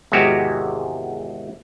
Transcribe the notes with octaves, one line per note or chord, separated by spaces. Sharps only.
G#1 E2 C3 G#3 F#4 G4